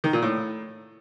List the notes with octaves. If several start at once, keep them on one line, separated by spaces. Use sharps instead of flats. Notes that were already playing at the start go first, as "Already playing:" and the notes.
D#3
A#2
A2